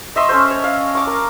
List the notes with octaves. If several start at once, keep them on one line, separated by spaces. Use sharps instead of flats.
D#5 E5 C6 C#6
C#4 A4 C5
C#5
F5
C#6 D6
A#4